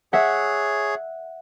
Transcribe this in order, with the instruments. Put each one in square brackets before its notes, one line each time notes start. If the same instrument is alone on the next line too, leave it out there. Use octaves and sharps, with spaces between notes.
[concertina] G#4 C#5 [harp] E5 F#5